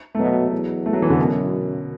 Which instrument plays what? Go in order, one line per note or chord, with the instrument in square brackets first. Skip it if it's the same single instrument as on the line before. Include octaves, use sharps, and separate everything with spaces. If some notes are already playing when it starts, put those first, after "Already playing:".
[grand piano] A3
[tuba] B2 [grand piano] F#3
[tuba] E2
[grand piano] A3
F#3
E3
D3
[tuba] F#2 [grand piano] B2